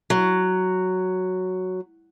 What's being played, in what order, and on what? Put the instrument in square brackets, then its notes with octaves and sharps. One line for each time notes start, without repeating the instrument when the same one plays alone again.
[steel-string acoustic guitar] F#3